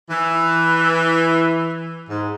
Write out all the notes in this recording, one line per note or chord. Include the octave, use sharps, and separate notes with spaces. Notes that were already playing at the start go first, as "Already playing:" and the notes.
E3
G#2